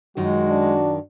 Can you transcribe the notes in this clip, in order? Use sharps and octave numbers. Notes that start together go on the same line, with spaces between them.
F#2 D#3 G#3 F4 F#4
D4